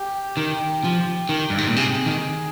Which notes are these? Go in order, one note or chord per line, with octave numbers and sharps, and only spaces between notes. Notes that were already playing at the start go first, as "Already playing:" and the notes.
Already playing: G4
D#3
F3
D#3
G2
G#2
A#2
C3 G#4
D#3